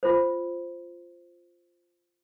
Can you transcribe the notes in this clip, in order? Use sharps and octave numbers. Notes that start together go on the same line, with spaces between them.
F4 C5